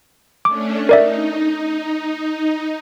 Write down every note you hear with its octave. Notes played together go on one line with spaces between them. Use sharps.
A3 C#4 D4 D6
D#4 A#4 D5 E5